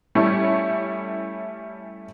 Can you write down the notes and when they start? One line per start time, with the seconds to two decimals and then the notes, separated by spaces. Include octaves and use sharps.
0.15 G3 A3 C#4 E4